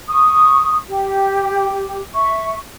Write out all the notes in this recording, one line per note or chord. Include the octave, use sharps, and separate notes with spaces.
C#6 D#6
G4
E5 C#6